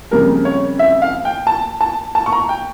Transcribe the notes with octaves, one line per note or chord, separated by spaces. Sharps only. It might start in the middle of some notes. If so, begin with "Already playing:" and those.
F2 C#3 G3 A#3 A#4
C#5
E5
F5
G5
A5
A5
A5
C#6
A#5
G5